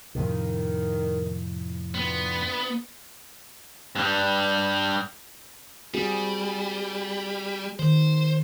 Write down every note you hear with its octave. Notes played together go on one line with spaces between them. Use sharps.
F2 A2 C3 D#3
D3 B3 F4 G5
G2 G3
G3 C4 F#4 G#4
D#3 C5